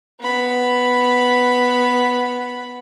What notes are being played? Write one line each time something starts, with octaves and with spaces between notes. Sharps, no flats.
B3 B5